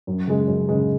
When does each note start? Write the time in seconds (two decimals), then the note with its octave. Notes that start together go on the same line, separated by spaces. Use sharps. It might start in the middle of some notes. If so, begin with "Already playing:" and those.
0.07 F#2
0.27 C#3 G#3
0.47 F#2
0.69 C#3 G#3